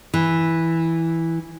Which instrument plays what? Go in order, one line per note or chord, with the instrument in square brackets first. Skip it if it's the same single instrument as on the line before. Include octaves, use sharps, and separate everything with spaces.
[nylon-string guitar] E3